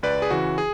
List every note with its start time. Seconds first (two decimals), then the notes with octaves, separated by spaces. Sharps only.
0.03 C#2 B4 D5
0.22 G#4
0.30 C#3 E3 F#4
0.58 G#4